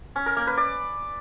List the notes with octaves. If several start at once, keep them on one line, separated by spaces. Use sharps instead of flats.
C#4
A#4
A#3
B4
D5